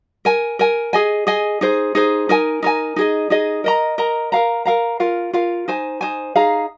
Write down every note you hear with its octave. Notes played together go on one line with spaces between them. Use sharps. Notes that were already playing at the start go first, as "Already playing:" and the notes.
A#4 G#5
A#4 G#5
G#4 D#5 G#5
G#4 D#5 G#5
D#4 G#4 C5
D#4 G#4 C5
D#4 A#4 G#5
D#4 A#4 G#5
D#4 G#4 D#5
D#4 G#4 D#5
A#4 D#5 A#5
A#4 D#5 A#5
A#4 F5 A#5
A#4 F5 A#5
F4 A#4 F5
F4 A#4 F5
D#4 C5 G#5
D#4 C5 G#5
D#4 G#4 F5 A#5